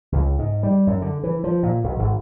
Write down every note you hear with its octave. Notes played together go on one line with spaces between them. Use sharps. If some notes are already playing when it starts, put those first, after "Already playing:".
C#2
G#2
G3
F#2
D3
E3
F3
A#2
B1
G#1